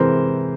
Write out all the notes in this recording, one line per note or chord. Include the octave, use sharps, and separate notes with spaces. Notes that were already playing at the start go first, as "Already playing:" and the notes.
Already playing: C3 E3 G#3 A#4 C5